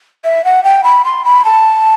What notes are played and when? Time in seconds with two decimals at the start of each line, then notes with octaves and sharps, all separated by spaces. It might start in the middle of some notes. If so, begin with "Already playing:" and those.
0.25 E5
0.45 F#5
0.64 G5
0.84 B5
1.05 C6
1.25 B5
1.45 A5